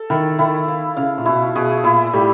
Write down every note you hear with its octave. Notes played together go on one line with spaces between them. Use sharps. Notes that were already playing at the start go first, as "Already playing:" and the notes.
Already playing: A4
D#3 E4
D#3 E4
F5
C#3 F5
A#2
B2 E4
B2 G#4
A#2 E4
A2 G3